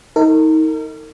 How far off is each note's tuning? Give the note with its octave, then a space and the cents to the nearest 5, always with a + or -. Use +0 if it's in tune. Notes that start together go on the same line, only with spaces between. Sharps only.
D#4 +30 A#4 -40